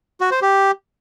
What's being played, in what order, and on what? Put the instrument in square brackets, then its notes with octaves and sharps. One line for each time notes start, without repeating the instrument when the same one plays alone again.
[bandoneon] F#4
C5
G4